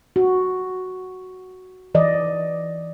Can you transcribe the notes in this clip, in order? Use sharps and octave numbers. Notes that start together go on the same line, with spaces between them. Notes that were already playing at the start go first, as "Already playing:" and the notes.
F#4
E3 D5 D#5